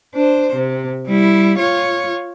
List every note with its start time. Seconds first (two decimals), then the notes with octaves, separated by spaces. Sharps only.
0.15 D4 C5
0.55 C3
1.07 G3 E4
1.58 F4 C#5